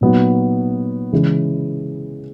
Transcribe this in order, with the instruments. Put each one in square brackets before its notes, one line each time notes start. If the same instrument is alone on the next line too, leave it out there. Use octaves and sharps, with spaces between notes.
[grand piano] A#2 F#3 B3 D#4
C#3 E3 G#3